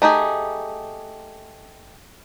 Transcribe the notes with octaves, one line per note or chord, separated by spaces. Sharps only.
A3 D#4 G4 G#4